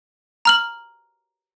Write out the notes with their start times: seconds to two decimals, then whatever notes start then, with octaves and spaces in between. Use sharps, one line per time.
0.45 A#5 F6 F#7